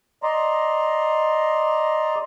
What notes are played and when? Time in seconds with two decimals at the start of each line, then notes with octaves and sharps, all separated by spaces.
0.23 D5 D#5 A#5 C6